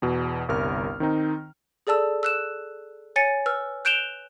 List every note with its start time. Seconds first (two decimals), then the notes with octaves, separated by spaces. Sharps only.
0.02 E2 B2
0.48 G1 C2 A#4 F6
1.00 D#3 C4 D#4
1.87 G#4 A4 D5 A5 E6
2.23 E6 F#6 E7
3.16 C#5 G#5 A6 C#7 D#7
3.46 B4 E6 F6
3.85 F#6 G6 D7 E7 F7 G7